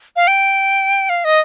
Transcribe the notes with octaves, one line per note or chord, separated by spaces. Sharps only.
F5
G5
F5
D#5